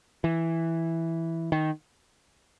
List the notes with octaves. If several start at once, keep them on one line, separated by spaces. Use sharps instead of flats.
E3
D#3